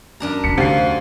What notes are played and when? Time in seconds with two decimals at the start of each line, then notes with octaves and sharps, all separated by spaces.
0.20 F#2 D4 A#5
0.44 E2 C3 B6 C#7
0.58 D2 G4 C5 F5 C7